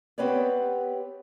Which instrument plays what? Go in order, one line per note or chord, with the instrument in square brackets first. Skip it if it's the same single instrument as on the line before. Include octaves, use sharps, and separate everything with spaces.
[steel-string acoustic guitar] B3 C4 G4 B4 C#5 D5